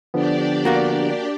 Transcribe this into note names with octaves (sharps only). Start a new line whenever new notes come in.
D3 F3 B3 D4 G4 D5
A#3 F#4 A#4